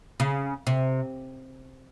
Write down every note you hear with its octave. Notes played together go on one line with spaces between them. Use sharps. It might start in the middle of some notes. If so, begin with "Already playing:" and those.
C#3
C3